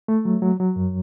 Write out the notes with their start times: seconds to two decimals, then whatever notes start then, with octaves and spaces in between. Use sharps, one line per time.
0.08 A3
0.25 F#3
0.42 F#3
0.60 F#3
0.76 F#2